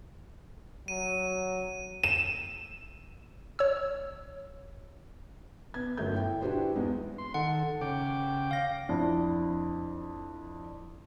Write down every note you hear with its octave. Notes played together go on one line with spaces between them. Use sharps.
F#3 D#7
E7
C#5 E6
B3 G#6
G1 F#2 F#3 A3 A#4 G6
E4 G5
D4 E4 F#4 G4 B4 C5
E2 G#3 B3
C6
D#3 A4 F#5
C#3 G5 D6
F5 A#6
F2 D4 E4